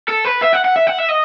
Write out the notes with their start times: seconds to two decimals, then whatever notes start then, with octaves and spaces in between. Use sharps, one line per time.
0.09 A4
0.25 B4
0.42 E5
0.53 F#5
0.65 F#5
0.76 E5
0.87 F#5
0.98 E5
1.09 D#5